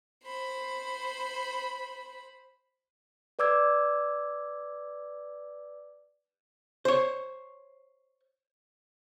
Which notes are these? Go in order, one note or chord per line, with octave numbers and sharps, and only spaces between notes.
C5 B5
B4 D5 D6 E6 G#6
C5 C#5